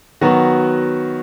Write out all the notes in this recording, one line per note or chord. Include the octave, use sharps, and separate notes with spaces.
D#3 F#3 B3 F#4